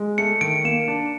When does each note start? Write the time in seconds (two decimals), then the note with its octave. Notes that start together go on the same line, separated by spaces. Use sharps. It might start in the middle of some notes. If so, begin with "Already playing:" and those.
Already playing: G#3
0.18 A3 C#7
0.41 D#3 D7
0.64 A#3 E7
0.88 D4